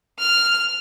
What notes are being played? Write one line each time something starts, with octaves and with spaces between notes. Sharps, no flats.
F6